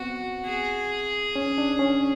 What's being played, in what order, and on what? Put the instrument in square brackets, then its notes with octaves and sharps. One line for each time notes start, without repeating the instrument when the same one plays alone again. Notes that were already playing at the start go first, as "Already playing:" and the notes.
Already playing: [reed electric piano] B3 C4 [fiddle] F#4
[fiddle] G#4
[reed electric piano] C#4
D4
C#4